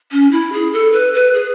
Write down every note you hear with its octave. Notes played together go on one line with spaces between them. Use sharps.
C#4
E4
G#4
A4
B4
B4
G#4